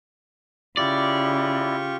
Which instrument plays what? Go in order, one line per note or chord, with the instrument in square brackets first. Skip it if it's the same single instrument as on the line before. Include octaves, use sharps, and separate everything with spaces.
[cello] C#3 [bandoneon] E4 [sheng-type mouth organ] F4 G4 C#6 [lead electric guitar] D5